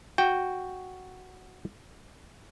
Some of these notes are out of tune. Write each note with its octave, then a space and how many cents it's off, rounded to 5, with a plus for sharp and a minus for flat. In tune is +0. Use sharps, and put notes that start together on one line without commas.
F#4 +0 G5 +0